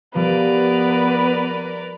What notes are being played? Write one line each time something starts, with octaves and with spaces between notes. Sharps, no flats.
F3 G3 B3 A#4 B4 D5